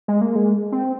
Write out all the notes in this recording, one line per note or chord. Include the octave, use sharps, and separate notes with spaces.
G#3
A#3
G#3
C4